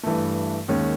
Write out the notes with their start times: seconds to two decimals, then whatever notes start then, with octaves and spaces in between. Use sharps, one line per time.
0.03 G2 E3 A3
0.68 D#2 D#3 G#3 C#4